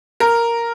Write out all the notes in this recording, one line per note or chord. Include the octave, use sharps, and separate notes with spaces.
A#4